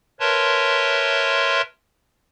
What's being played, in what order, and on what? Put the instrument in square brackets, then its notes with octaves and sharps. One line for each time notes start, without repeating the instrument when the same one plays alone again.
[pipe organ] A#4 B4 C#5 E5 A5 C6